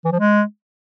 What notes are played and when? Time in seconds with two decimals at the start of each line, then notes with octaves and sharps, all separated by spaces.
0.05 E3
0.12 F3
0.19 G#3